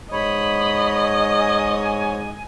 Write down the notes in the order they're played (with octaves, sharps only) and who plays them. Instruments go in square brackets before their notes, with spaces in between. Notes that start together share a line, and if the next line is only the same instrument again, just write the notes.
[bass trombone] G#2 [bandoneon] C#5 [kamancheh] D#5 [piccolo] B5
[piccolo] G#5